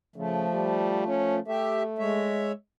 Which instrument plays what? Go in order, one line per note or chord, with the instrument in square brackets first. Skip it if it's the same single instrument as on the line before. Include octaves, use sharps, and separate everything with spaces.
[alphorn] C#3 [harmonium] F3 A3
[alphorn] G3
C#4
[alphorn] A3 [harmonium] G4 E5
[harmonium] G#3 C#5 E5